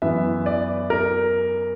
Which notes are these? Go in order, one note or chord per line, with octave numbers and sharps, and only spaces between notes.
F#2 E3 B3 E5
D5
A#4